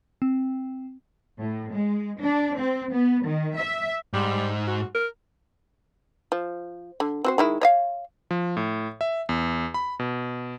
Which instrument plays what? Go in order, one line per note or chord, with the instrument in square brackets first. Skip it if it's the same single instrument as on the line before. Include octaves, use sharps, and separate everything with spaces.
[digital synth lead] C4
[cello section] A2
G#3
D4
C4
B3
D#3
E5
[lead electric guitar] G#2 [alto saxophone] G3
[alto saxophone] F#4
A#4
[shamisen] F3
D3
C4 F#4 C5
D#3 G#3 E4
C#5 D#5 F5
[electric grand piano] F3
A2
E5
E2
B5
B2